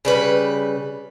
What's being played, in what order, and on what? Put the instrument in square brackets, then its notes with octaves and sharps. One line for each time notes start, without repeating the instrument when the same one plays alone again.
[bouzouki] C#3 G3 B4